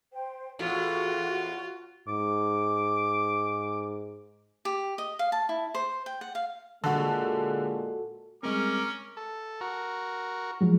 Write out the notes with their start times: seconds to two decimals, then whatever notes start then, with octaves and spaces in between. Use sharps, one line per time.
0.12 C5 G5
0.59 E2 A2 F4 F#4
2.08 G#2 D6
4.65 G4
4.98 D#5
5.19 F5
5.32 A5
5.49 E4
5.75 C5
6.06 G5
6.21 F#5
6.35 F5
6.84 A#2 D3 G#3 F#4 A4
8.43 G3 G#3 C4 C#4 A#4 A#5 D6
9.17 A4
9.61 F#4 A#4
10.61 F3 F#3 G#3